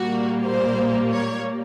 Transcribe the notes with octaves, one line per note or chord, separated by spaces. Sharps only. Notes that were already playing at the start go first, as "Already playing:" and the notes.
Already playing: A#2 G3 A#3 F#4
C5
C#5